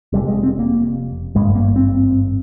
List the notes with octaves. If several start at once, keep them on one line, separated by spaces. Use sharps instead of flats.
F1 F2 C3 G3
G#3
C4
A#3
G#1 G2 G#3
A#3
C4